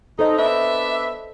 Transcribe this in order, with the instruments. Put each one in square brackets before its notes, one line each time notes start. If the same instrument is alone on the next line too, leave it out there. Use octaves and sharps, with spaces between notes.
[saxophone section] D#4 [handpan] A4 C5 D#5
[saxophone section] B3 D4 E5